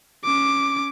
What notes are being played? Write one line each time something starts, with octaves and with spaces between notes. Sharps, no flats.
C#4 D6